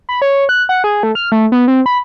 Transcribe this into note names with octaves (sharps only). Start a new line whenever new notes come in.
B5
C#5
F#6
F#5
G#4
A3
F6
A3
B3
C4
B5